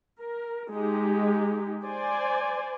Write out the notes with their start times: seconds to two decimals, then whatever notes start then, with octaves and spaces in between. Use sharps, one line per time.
0.19 A#4
0.70 G#3 D#4 G4
1.83 C5 D5 G#5